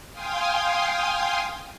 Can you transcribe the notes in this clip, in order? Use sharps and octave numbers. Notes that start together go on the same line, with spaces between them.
F5 G5 G#5 C6 D#6